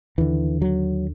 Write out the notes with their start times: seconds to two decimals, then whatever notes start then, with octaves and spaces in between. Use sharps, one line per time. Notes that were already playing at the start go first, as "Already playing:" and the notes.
0.18 D#2 D3 E3
0.62 F#3